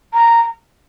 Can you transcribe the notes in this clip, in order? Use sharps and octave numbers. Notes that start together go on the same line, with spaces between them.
A#5